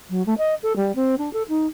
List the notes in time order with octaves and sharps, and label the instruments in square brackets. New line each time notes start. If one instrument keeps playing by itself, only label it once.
[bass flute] F#3
A3
D#5
A4
G3
C4
D4
A4
D#4